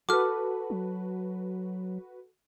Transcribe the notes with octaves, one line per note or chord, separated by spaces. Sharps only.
F#4 A4 B4 D6 F6
F#3